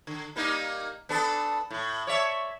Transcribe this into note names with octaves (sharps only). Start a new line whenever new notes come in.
D3
G3 A#3 D#4
B3 D4 A4
A2
C#5 D5 E5